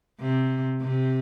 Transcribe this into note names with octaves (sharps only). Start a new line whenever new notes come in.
C3
C3